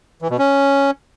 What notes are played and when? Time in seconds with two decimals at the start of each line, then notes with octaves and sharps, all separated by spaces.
0.22 E3
0.30 B2
0.39 C#4